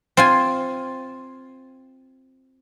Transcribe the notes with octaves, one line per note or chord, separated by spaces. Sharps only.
C4 F4 G#5